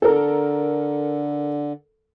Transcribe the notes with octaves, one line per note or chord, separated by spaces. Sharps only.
D3 A4 A#4